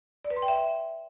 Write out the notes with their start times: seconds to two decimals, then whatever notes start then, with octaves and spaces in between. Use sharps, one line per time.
0.25 D5
0.30 B4
0.36 C6
0.42 G5
0.48 E5